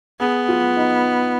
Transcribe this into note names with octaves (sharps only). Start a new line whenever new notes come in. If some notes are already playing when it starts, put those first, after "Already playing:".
B3 G#4
F4
D#4